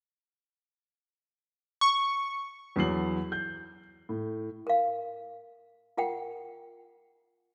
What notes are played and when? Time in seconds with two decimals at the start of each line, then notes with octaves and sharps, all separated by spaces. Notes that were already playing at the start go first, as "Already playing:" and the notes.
1.81 C#6
2.76 E2 F#3 C7 F#7
3.32 G6
4.09 A2
4.67 A#4 F5
5.97 F4 A#4 F#5 G5